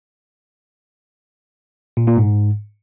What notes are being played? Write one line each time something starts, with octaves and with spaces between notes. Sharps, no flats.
A#2
A#2
G#2